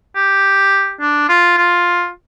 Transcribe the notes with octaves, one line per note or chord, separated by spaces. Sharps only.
G4
D4
F4
F4